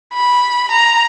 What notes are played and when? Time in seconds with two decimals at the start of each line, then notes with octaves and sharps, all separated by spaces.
0.14 B5
0.72 A#5